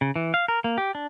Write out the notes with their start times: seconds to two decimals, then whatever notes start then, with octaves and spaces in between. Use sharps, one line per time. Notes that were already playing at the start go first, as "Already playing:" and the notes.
0.01 C#3
0.16 E3
0.34 F5
0.48 A#4
0.64 A#3
0.78 G4
0.95 D4